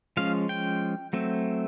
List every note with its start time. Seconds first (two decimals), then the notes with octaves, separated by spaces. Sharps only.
0.17 F3 G#3 C#4 F5
0.49 G5
1.13 F#3 A3 C4